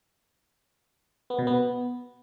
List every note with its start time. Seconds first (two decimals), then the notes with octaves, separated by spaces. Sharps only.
1.30 B3
1.39 B2
1.47 B3